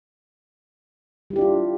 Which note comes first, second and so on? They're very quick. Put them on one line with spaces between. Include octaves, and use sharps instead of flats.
G3 E4 G4 D4 F4